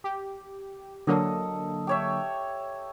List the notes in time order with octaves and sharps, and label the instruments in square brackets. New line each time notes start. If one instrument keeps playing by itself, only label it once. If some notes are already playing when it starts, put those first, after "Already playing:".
[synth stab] G4
[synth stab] D3 F#3 A#3 [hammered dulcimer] A4 D#5
[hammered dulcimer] G4 C#5 E5